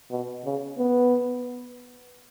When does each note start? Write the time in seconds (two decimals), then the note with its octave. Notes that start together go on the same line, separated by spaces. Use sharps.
0.11 B2
0.45 C#3
0.78 B3